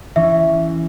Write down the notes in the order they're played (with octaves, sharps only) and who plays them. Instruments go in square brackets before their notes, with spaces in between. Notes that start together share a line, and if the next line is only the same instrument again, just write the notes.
[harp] E3 C#4 [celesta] E5